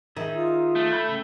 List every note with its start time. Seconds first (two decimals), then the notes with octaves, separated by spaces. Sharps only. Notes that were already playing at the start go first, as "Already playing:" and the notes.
0.16 D#3 D#4 G#4 E5
0.34 F4
0.76 A3
0.91 B5 G6
1.09 C#3 G5